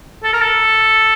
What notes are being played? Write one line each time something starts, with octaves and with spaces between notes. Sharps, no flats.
A4
A#4
A4